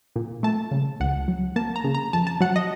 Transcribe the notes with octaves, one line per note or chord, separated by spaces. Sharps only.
A#2
A3 A5
C#3
C#2 F#5
F#3
A#3 A5
A#5
C#3
A#5
F2 A5
A5
F#3 F#5
D#5